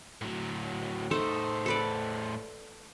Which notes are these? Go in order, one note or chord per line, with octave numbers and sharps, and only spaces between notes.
A2 F#3
A2 A3 D#4 A4 C5
A4 B4 D5